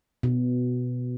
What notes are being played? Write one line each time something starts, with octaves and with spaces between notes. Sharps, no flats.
B2